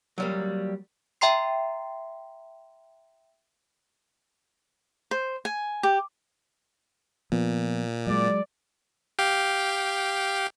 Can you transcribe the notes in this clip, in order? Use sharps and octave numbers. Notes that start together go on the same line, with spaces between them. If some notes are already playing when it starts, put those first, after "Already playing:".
F#3 G3 A#3
E5 G5 A#5 C6 C7
C5
G#5
G4
A#2 F3 B3
F#3 G#3 D5
G4 F5 G5